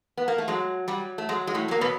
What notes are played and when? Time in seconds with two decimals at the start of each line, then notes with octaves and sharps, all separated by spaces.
0.17 B3
0.28 A#3
0.38 A3
0.48 F#3 G#3
0.88 F#3 G3
1.18 A3
1.29 F#3 G#3
1.47 G#3
1.54 A2 A3
1.68 F#3 A#3
1.81 B2 B3